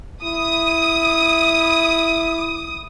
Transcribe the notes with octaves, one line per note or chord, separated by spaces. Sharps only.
E4 D#6